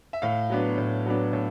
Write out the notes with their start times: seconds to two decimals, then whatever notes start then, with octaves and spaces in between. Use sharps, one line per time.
0.13 E5
0.22 A2 F5
0.50 F#3 B3 D4
0.78 A2
1.06 F#3 B3 D4
1.33 A2